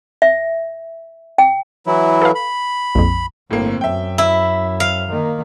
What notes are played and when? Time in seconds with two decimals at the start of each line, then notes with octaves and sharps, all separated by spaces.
0.22 E5
1.38 G5
1.87 E3 F#3 E4
2.22 A4 B4 F5
2.35 B5
2.95 A#1 F2
3.51 G1 A2 A#3 C4
3.81 F#2 E5 G5
4.18 E4 E5
4.80 F5
5.10 D#3 A#3